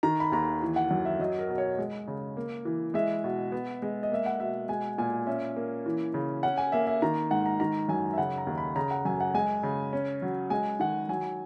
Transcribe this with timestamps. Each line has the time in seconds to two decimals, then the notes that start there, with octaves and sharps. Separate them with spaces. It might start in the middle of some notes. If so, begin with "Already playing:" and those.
0.03 D#3 A#5
0.20 B5
0.32 D#2 A#5
0.62 E3
0.76 F#5
0.91 F#2
1.05 E5
1.19 F#3 D#5
1.39 A#4
1.49 B2
1.58 C#5
1.78 G#3
2.08 C#3
2.37 A#3
2.65 E3
2.94 G#3 E5
3.24 B2
3.52 B3
3.82 G#3
4.03 D#5
4.11 A#3 E5
4.26 F#5
4.40 B2 E5
4.68 G#3 G#5
4.98 A#2 G#5
5.27 C#4 E5
5.57 A#3
5.86 E3
6.14 C#3
6.43 C#4 F#5
6.58 G#5
6.72 A#3 E5
6.87 E5
7.02 D#3 A#5
7.31 G#2 F#5
7.46 A#5
7.60 D#3 A#5
7.89 F#2 G#5
8.13 E5
8.18 C#3 F#5
8.38 A#5
8.47 D#2
8.58 B5
8.76 C#3 A#5
8.91 F#5
9.05 F#2 G#5
9.20 F#5
9.34 G#3 G#5
9.63 C#3
9.93 C#4
10.22 F#3
10.50 G#3 G#5
10.80 D#3 F#5
11.09 F#3 G#5